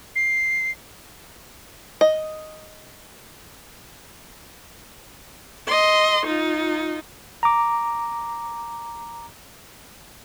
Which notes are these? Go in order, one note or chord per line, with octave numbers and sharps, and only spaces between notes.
C7
D#5
D#5 C6
D#4 F4
A#5 D6